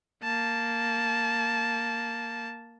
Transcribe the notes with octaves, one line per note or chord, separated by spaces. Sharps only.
A#3 A5